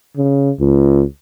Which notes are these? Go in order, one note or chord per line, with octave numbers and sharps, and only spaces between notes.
C#3
C#2